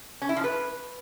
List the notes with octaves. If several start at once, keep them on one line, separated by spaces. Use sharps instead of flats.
C#4
E4
F3
B4